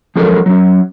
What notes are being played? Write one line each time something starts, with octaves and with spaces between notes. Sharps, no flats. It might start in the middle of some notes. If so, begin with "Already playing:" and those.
F3 F#3 G#3 C#4 A4 A#4
F#3 C#4